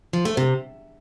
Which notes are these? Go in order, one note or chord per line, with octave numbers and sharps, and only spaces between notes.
F3
A3
C3